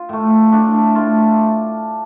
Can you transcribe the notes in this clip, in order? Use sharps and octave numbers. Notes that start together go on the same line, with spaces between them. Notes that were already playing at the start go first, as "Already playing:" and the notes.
Already playing: F4
A2 A3
A2 A3 D4
D4
A2 A3 F4